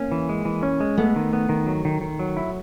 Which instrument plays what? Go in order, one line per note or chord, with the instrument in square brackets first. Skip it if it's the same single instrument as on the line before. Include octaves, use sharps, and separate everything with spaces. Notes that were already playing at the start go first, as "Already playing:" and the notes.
Already playing: [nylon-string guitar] A#3 [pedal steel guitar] C#4
[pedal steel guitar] E3
G#3
E3
C#4
G#3
[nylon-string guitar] A3 [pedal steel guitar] B3
[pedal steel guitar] D#3
B3
D#3
F#3
D#3
D#3
F#3
E4